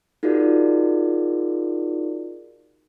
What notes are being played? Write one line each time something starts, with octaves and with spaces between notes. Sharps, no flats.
D#4 F4 F#4 G#4 A#4 D5